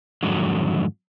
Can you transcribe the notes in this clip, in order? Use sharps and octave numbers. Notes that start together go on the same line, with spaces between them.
F2 G#2 D3 D#3 F#3